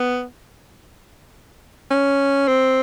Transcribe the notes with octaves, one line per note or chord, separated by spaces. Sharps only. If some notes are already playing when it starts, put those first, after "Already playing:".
Already playing: B3
C#4
C4